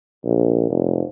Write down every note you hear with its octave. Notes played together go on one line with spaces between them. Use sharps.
A#1
F1